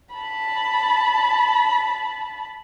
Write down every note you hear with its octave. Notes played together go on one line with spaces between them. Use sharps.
A5 B5